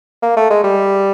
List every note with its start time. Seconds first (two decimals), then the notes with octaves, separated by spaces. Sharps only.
0.22 A#3
0.36 A3
0.50 G#3
0.64 G3